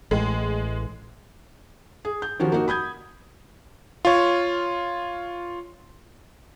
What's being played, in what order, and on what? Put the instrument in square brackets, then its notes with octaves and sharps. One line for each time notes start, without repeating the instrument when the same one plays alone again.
[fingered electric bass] A1 A2 [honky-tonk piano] G#3
[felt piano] G#4
G6
D#3 F3 C#4 F#4 G4
A#3 D#4 F#4
B5 D#6 G6 G#6
[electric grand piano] F4 C#5